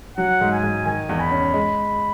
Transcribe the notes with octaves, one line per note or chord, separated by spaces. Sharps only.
F#3 F#5
G#2
G#5
G#2
D#3 G#5
E2
B5
C#4
G#3